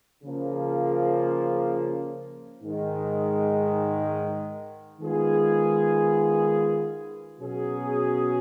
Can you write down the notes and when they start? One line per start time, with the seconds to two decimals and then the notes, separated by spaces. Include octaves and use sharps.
0.24 C#3 F3 A#3
2.63 G#2 D#3 G#3
5.01 D#3 G#3 B3 F4 G#4
7.39 B2 F#3 C#4 G#4